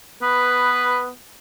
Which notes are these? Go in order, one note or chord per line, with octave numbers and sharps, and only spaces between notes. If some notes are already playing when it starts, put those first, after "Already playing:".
B3 B4